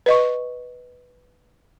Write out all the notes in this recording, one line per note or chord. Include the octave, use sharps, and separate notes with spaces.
B4 D#5 C#6